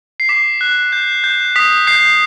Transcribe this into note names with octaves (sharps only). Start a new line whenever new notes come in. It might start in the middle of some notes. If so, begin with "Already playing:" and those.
C7
D6 B6
F#6
G6
G6
D#6 B6
G6 C7